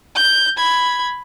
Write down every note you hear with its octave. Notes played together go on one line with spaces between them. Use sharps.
G6
B5 G#6